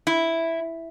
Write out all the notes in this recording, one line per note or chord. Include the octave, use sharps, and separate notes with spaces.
E4